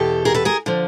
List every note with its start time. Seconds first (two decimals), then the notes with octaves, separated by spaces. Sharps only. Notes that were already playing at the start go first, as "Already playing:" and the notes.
Already playing: E2 B2 G4 A4
0.25 G#4 A#4
0.34 A4 B4
0.45 G#4 A#4
0.66 D3 F3